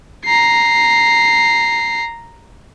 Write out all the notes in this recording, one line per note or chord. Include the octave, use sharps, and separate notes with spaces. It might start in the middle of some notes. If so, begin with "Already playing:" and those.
A#5 C7